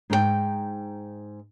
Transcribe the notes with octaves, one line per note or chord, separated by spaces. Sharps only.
G#2 D#4 G#4 G5